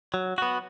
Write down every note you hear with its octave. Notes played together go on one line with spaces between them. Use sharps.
F#3
B3 F#4